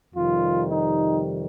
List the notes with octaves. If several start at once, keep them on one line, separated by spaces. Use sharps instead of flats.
F2 C3 D#3 G3 F4
D#4